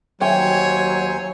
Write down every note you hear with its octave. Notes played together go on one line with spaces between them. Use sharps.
D#2 F#3 C5 C#5 G5 G#5